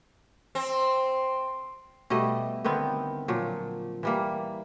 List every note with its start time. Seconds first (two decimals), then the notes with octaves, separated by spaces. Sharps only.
0.55 C4
2.10 B2 G3 A3 D#5
2.64 D3 D#3 B3 C4
3.28 A#2 F3 F#3
4.03 E3 G3 A#3